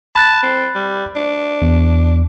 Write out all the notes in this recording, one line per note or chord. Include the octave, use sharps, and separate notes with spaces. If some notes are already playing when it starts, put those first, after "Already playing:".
A5 B5 F#6 A6
C4
G3
D4
E2